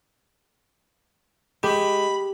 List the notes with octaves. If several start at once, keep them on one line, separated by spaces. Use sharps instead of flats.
G#3 G4 B5